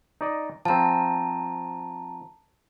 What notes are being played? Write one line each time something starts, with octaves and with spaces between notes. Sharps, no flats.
D#4 D5 D#5
F3 C4 A5 A#5